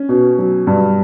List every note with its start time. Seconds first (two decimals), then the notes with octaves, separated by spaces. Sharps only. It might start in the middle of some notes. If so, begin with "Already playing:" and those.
Already playing: C#4
0.09 B2
0.39 F#3
0.67 G2